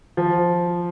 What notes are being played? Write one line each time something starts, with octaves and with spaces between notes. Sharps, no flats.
F3